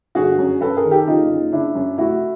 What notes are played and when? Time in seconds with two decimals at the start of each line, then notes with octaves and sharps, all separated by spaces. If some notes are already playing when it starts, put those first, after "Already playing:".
0.15 G1 F#4 G#4
0.38 F#2
0.61 F#2 A4 B4
0.76 G#4 A#4
0.85 D#3
0.91 G4 A4
1.07 F#1 D#4 F4
1.29 F#1
1.52 C#3 D4 E4
1.75 F#2
1.98 F1 E4 F#4